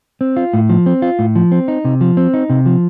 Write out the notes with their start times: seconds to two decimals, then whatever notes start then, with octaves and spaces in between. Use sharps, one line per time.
0.21 C4
0.37 F4
0.53 A2
0.70 F3
0.86 C4
1.02 F4
1.19 A2
1.36 F3
1.52 C4
1.68 D#4
1.85 C3
2.01 F3
2.17 C4
2.34 D#4
2.50 C3
2.66 F3